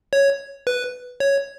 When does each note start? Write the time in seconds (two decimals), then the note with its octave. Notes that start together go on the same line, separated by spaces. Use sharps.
0.13 C#5
0.67 B4
1.20 C#5